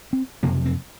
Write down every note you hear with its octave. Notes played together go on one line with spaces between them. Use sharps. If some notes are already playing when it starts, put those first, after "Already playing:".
C4
F#1 F2 C3 A#3
C4